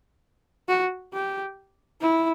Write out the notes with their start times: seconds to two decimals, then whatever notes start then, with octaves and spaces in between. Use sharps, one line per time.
0.69 F#4
1.14 G4
2.01 E4